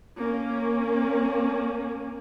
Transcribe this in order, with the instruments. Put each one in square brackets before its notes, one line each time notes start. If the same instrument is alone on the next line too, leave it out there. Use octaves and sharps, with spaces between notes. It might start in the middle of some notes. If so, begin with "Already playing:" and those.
[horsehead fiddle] A#3 C#4